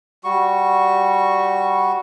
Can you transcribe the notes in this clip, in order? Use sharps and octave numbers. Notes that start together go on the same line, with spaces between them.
G3 F#4 C#6